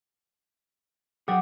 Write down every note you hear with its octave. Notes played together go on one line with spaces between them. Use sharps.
F#3 G#4 F#5 G5 D6